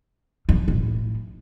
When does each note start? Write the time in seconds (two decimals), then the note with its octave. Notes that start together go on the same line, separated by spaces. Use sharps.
0.49 F2
0.68 A2